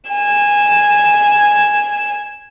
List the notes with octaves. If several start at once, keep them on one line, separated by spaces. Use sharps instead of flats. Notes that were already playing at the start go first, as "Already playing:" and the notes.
G#5 E7